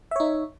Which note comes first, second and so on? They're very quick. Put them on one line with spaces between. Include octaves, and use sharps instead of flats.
E5 C#5 D#4